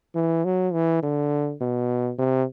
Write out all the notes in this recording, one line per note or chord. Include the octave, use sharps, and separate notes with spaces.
E3
F#3
E3
D3
B2
C3